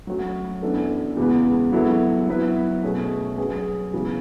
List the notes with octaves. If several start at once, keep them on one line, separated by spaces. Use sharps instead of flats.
F#3 A3 C#4 F#4
F#2 E3 B3 D4 A4
E2 C#3 G#3 B3
F#3 B3 E4 A4
F#3 B3 E4 B4
B2 A3 C#4 G#4
F#3 C#4 G#4 B4
E2 C#3 G#3 C#4